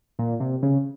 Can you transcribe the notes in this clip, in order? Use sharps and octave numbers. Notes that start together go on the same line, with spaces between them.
A#2
C3
C#3